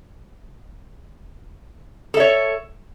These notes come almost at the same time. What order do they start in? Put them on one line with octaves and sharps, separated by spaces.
A4 E5 C#5